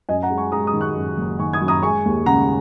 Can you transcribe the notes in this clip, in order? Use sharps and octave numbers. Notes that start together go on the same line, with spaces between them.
F#2 D#5 G#5
F#5 A#5
G#3
G#5 C#6
G#3 A#5 D#6
A#5 D#6
D#3
C#6 F#6
F#2
F#1
D#3 G#5 C#6
D#6 G#6
F#2
A#5 D#6
G#3 G#5 C#6
D#2
C#3 F#5 A#5